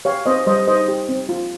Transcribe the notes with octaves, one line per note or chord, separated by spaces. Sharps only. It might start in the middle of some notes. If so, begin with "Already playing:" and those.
G4 C#5 F5
C4 C5 D#5
G3 C5 D#5
D#4 C5 D#5
G4
C4
F4